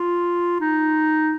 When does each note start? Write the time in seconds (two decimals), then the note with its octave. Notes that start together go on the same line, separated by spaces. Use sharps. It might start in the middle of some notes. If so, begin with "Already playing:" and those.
Already playing: F4
0.60 D#4